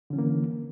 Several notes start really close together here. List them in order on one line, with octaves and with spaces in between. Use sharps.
D3 C#4 E3 A#3